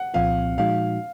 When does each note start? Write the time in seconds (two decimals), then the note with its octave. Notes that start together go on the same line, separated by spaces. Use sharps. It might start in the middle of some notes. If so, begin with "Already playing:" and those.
Already playing: F#5
0.14 C2 A#2 F3 C4 F4 F5
0.57 A#2 F3 G#3 D#4 F#4 F5